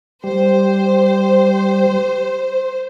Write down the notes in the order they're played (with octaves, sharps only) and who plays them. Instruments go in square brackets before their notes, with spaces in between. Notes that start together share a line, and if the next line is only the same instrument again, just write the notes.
[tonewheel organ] G3 [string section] C5